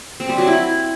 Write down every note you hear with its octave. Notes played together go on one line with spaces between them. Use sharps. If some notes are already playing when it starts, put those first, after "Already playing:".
C4
G3
F#3
E4